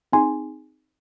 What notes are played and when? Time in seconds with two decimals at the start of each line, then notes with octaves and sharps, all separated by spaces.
0.13 C4 D#4 G#4 G#5 C6